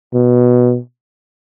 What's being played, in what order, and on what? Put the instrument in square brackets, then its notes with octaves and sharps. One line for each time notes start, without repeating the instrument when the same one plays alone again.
[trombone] B2